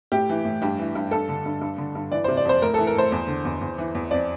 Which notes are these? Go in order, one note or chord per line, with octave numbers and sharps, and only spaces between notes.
A2 G4
E3
A2
G2 G4
E3
G2
G2 A4
D3
G2
G2
D3
G2
E3 D5
C5
C3
D5
F2 C5
A2 A#4
A4
E3
A#4
A2 C5
E2
D3
E2
E2
E3
E2
F2 D5